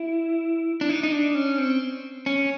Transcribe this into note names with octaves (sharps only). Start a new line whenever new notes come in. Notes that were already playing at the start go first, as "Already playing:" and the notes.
Already playing: E4
D4
D#4
D#4
D4
C#4
C4
C#4